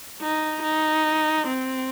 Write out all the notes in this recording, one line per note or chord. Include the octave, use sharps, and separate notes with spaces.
D#4
D#4
C4